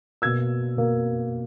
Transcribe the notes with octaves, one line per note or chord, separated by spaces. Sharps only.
B2 A#3 E6 G#6
B2 A#3